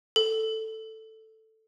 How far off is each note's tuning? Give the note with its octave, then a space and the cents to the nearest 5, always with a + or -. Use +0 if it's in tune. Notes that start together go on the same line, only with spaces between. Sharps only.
A4 +5